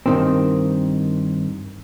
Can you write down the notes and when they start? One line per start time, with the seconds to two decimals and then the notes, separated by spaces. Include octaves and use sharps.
0.06 G2 D#3 C4